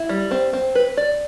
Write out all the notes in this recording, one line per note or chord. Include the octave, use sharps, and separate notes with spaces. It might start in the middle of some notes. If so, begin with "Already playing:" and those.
Already playing: E4
G3
C4
C4
B4
D5